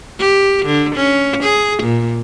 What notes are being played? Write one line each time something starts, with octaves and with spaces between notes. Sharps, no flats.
G4
D3
C#4
G#4
A#2